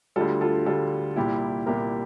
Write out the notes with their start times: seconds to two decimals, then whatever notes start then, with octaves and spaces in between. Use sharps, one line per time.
0.16 D2 D3 G3 F4 A4
0.41 F4 A4
0.66 D2 D3 G3 F4 A4
1.16 C2 A#2 G3 E4 G4
1.66 C2 A#2 G3 G4 A#4